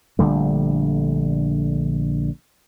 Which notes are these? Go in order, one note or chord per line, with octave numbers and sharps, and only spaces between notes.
A#1 D3 G3 A3